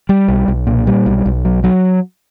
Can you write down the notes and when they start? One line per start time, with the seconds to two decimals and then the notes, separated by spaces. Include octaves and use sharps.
0.09 G3
0.28 B1
0.48 B1
0.67 A#2
0.87 G3
1.06 B1
1.26 B1
1.45 F#3
1.64 F#3